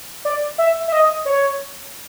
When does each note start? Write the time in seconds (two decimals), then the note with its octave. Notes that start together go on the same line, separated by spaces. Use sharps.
0.25 D5
0.58 E5
0.88 E5
0.92 D#5
1.25 C#5